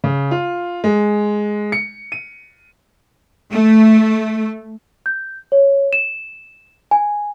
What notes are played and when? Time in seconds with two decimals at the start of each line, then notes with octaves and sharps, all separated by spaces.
0.04 C#3
0.31 F4
0.84 G#3
1.72 C#7
2.12 D#7
3.52 A3
5.06 G6
5.52 C#5
5.93 E7
6.91 G#5